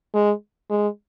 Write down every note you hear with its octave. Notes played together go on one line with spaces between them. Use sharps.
G#3
G#3